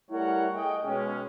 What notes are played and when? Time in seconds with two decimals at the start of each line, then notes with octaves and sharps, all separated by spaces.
0.11 G3 A3 E4 A#4 C#5 F#5
0.55 G#4 D#5 G5
0.85 B2 G#3 C#4